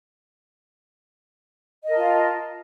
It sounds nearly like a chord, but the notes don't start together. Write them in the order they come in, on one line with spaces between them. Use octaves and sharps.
D#5 A#4 A5 F4